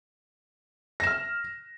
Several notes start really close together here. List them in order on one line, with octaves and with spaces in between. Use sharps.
A#6 E7 F6